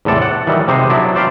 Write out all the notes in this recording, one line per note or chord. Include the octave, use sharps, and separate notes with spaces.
E2 A2 C3 A4 D5
F#5
D#3 E3 F#3 G3
C3 G#3 D#4 C5
F#3 B3 D4 E4
C5 D5 E5 F5 G5